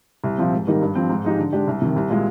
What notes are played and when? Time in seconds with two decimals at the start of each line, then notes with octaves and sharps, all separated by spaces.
0.24 C2
0.38 A#2 F3 C4
0.53 G#2
0.67 D#3 G3 A#3 D#4
0.82 G2
0.95 F3 C4
1.09 G#2
1.25 F3 G#3 D#4 G4
1.39 D3
1.53 G#3 D4 G4
1.67 C2
1.82 C3 D#3
1.96 C2
2.10 A#2 G#3